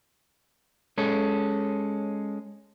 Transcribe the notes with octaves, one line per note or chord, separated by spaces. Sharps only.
G#3 C#4 A4